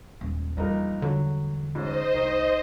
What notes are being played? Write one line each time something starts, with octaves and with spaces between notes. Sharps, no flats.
D#1 G#2
A#1 E2 G2 D#4 A#4
D3 F#3
G#2 C#4 C5 D#5
C2 D#3